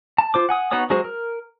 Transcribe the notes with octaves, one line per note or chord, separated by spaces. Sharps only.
A5
F4 C5 D6
F#5 G#5 D#6
B3 D#4 F#4 C#5 D#6
F#3 G#3 F#4 G#4 C5
A#4